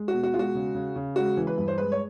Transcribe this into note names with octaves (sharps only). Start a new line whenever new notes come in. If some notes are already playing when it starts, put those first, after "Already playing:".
Already playing: G#3
F#4
B2
F#4
G#3 F4
F#4
C#3
C#3
C#3
G#3 F#4
E3
B4
G2
C5
G#3 B4
C#5